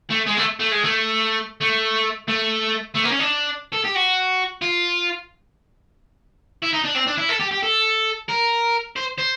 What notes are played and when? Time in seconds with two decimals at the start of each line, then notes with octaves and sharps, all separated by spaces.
0.10 A3
0.27 G#3
0.37 A3
0.60 A3
0.72 G#3
0.84 A3
1.61 A3
2.28 A3
2.94 A3
3.03 A#3
3.11 C#4
3.19 D4
3.72 A4
3.84 G4
3.95 F#4
4.62 F4
6.63 E4
6.73 D#4
6.85 D4
6.96 C4
7.07 D4
7.18 E4
7.29 A4
7.40 G4
7.51 G4
7.63 A4
8.29 A#4
8.96 C5
9.18 C5